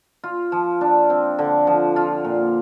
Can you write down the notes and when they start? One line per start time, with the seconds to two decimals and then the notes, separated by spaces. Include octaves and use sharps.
0.24 F4
0.52 F3
0.81 D4
1.10 C4
1.39 D3
1.67 F3
1.96 F4
2.24 A#2